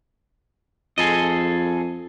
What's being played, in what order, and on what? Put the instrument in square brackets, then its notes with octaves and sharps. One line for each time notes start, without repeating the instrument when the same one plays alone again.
[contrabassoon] F2 [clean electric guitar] G#4 A4 D#5